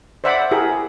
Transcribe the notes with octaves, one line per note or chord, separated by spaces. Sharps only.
C5 D5 E5 F#5 B5 D6
E4 G4 G#4 A#4